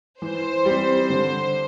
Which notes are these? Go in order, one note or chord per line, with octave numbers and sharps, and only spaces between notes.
E3 C5
G3 C4
D3